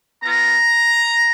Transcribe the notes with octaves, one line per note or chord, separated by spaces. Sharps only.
B3 F4 A#5